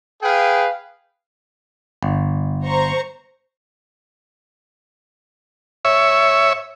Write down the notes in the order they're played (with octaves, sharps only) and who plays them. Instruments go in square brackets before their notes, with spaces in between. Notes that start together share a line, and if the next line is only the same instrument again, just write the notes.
[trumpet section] G#4 B4 F5 G5
[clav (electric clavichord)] G1
[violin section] C5 A#5 C#6
[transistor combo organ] C#5 E5